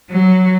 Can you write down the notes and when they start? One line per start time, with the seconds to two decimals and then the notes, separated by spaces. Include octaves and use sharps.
0.10 F#3